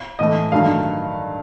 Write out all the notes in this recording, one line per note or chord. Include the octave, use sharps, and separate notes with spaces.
A2 E3 A3 D#5
G2 D#3 F#3 A3 F5